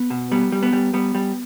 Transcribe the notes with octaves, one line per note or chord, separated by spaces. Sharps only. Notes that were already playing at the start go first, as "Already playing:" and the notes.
Already playing: B3
B2
G3 B3
G3
B3
G3
G3 B3
G3